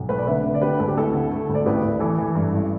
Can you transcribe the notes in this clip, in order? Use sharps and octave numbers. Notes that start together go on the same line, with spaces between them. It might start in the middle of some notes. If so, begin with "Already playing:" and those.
Already playing: B1
A3 B4
D5
D3 B4 E5
D3
D5
D3 G4 B4
D2 A4
G4
A3 E4 A4
D3
A3
D2
D5
A1 G4 B4
A1
E3 E4 A4
E3
G2
A1